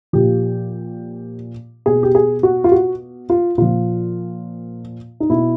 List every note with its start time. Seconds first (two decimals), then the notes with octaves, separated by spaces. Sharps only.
0.13 A#2 F3 G4
1.86 B2 G#4
2.03 G4
2.15 G#4
2.43 F#4
2.64 F4
2.72 F#4
3.30 F4
3.58 A#2 F3 F4
5.20 D#4
5.30 B2 E4